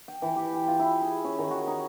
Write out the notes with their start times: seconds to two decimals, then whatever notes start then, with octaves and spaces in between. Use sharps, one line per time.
0.08 G5
0.22 E3
0.36 G4
0.53 G5
0.67 F4
0.79 E4
1.02 G#4
1.24 C#4
1.38 D#3
1.50 F#4
1.67 D#4